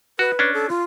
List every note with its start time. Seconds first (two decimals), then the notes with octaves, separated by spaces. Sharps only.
0.19 F#4 B4
0.39 C#4 D4
0.54 A4
0.70 F4